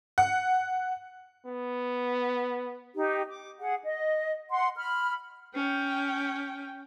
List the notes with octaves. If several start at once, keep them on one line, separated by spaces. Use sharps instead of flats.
F#5
B3
D#4 G4
D6
G#4 F#5
D#5
F#5 C6
B5 F6
C#4 G5